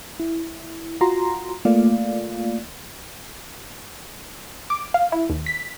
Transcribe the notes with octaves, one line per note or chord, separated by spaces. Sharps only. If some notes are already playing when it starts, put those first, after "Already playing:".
E4
F4 F#4 A#5 C6
A3 A#3 F4 D5 F5
D6
F5
E4
D#2
B6